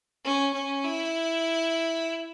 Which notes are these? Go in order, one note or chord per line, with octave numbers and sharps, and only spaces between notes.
C#4
C#4
E4